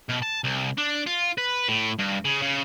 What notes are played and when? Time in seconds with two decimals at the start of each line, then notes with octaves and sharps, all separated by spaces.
0.10 B2
0.23 A5
0.44 C2
0.78 D4
1.07 F4
1.38 B4
1.68 A2
1.99 G2
2.25 C#3
2.42 C#3